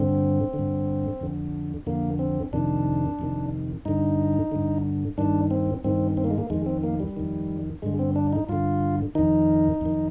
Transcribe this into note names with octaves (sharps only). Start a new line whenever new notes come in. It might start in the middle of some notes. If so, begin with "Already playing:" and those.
Already playing: G2 D3 C4
D3
G2
F2 D3
F2 D3 A#3
C4
F2 C3 D#3 D4
F2 C3 D#3
G2 D3 D#4
G2 D3
G2 D#3 D4
C4
G2 D#3 C4
C4
A#3
G#3
A#3
F2 D#3 G#3
C4
A#3
G3
F2 D#3
G2 D3 G#3
C4
D4
D#4
G2 D3 F4
F2 D#3 D#4
F2 D#3